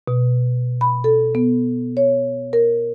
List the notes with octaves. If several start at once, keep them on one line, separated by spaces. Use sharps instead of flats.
B2
B5
A4
B3
C#5
A#4